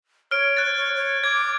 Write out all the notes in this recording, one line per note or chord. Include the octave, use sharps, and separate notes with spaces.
C#5 F6 D7
F#6 A6
C#5
C#5
D6 G#6